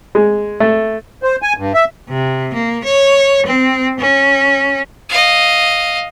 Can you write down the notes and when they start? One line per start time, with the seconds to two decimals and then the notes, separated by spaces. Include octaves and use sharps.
0.15 G#3
0.60 A3
1.23 C5
1.42 G#5
1.57 G2
1.74 E5
2.09 C3
2.54 A#3
2.84 C#5
3.46 C4
3.99 C#4
5.09 D#5 F5